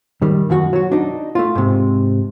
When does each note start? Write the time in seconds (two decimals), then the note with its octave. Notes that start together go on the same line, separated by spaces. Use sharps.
0.22 D#3 G3
0.50 F#2 D#3 F#4 F#5
0.73 F#3 F#4
0.92 D4 D#4
1.35 A3 F4
1.55 G#2 C3